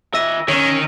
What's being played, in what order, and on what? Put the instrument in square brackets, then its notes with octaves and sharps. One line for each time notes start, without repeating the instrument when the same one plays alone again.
[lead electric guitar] D#3 E5 [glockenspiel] E6 A#6 D#7
[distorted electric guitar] D#3 [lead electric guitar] C#4 C#5